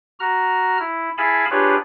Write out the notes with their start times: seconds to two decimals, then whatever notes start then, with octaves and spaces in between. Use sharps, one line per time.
0.20 F#4 A#5 F6
0.80 E4
1.18 E4 G#4 F5 G#5 A5 B5
1.51 D4 F4 G4 G#4 B4 C#5